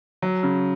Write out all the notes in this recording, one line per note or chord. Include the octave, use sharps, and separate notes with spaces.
F#3
C#3